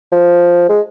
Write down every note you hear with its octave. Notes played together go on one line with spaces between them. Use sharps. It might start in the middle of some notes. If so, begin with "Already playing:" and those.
F3
G#3